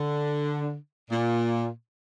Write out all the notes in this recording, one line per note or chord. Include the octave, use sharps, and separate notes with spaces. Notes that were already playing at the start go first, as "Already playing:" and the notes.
Already playing: D3
A#2